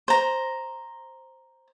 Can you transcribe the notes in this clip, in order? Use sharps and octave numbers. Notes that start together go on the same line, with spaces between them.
C5 A#5